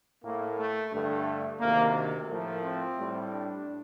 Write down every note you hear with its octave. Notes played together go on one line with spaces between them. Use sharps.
A2 A3 A#3
A3
G2 D3 A3
D2 C3 D#3 A#3
A2 F3 A3 A#3
C4
A2 G3
D4